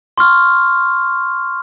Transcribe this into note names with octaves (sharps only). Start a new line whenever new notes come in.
C6 C#6 F6